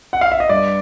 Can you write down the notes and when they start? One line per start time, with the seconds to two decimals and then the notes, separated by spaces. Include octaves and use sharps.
0.13 F#5
0.21 F5
0.32 E5
0.40 D#5
0.49 G2 D5